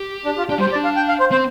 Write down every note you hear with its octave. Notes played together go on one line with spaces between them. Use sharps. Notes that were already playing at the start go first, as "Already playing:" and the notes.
Already playing: G4
D4
F4
D4 G4
G3 C5
G4
D5
D4
F5
G5
F5
C5
C4 C5